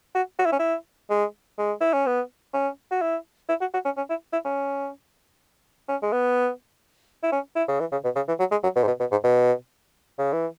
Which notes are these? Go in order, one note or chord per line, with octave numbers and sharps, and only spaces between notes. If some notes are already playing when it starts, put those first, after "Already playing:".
F#4
F#4
E4
C#4
E4
G#3
G#3
E4
C#4
B3
C#4
F#4
E4
E4
F#4
F#4
C#4
C#4
E4
E4
C#4
C#4
G#3
B3
E4
C#4
E4
C#3
E3
C#3
B2
C#3
E3
F#3
G#3
F#3
B2
G#2
B2
B2
G#2
B2
C#3
E3